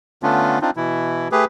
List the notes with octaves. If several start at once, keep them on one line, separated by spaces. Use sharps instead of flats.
D3 A3 B3 C#4 D4 F4
C4 D4 D#4 F4
B2 E3 E4
A3 G4 G#4 B4